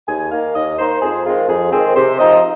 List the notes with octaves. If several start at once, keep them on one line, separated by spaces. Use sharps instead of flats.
D#2 G#5
D#3 A#3 D#4 F5
D#2 D#5
D#3 A#3 D#4 C5
F2 G#4
D#3 G#3 C4 F4
F2 G#4
D#3 G#3 C4 G#4
C3 C5
F3 C4 D#4 D#5